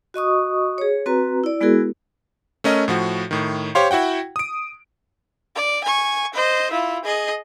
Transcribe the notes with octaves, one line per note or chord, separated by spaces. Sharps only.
F#4 D#5 C#6 D#6
G#4 C#5
C4 F#4 B4 A#5
E4 D5
G#3 B3 E4 F#4 G#4 A#4
A3 C#4 A#4 D#5
A2 F3 F#4
A2 D#3
G4 C5 C#5 F5 C6
E4 F#4 F#5 G5
D#6 D7
D5
G#5 C#6
C5 D#5
E4 F4
G#4 D#5